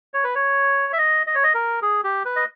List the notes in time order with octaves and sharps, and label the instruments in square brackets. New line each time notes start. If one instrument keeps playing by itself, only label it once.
[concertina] C#5
B4
C#5
E5
D#5
D#5
C#5
D#5
A#4
G#4
G4
B4
D#5